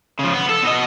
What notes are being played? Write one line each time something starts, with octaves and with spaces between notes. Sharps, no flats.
C#3 F3
B3
A4
B2 D#5